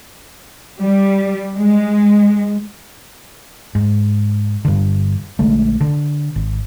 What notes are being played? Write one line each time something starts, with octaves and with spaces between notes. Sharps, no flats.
G3
G#3
G#2
G2 D3
A#1 D3 G#3 A3
D3
G#1